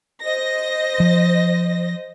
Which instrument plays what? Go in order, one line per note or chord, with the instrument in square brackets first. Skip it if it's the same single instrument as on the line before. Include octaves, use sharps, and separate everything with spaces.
[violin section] C5 D#5 A#6
[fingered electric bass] F3